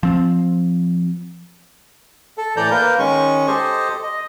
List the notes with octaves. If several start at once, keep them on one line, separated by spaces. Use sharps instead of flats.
F3 C4
A4
A2 E3 A4 D5 A#5 G6
A#3 A#4 B4 G6
D#3 G#3 C#4 C#6
G4 A4 C5 D#5
D#5